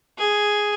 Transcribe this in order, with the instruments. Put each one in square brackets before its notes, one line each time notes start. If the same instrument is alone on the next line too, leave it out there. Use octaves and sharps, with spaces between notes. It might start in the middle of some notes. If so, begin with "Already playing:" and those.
[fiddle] G#4